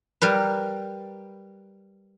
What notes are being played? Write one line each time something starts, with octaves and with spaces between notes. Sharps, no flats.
G3 A#4 B4